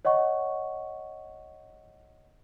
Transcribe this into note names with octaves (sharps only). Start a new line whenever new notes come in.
C#5 D#5 F#5 C#6